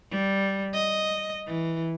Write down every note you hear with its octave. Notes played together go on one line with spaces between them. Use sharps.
G3
D#5
E3